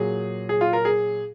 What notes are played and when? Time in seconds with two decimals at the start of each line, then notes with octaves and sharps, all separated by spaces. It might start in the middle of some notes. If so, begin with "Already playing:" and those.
Already playing: A#2 F#3 G#4
0.49 G#4
0.61 F4
0.73 A#4
0.85 G#4